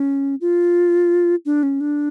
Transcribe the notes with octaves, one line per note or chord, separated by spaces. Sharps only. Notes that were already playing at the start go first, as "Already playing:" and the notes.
Already playing: C#4
F4
D4
C#4
D4